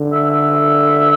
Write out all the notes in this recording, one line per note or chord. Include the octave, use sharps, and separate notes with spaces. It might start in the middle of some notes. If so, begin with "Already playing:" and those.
Already playing: D3
E5
E5